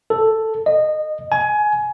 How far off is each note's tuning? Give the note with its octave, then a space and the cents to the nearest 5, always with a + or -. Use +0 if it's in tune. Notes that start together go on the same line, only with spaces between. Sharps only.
A4 +5
D#5 -20
G#5 +20